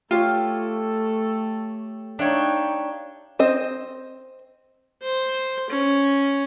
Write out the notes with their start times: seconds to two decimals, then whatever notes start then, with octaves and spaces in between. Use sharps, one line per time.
0.11 A3 F4 G4 A4 C#5 G5
2.19 D4 D#4 C#5 E5 F5 G5
3.39 C4 C5 D#5
5.03 C5
5.70 C#4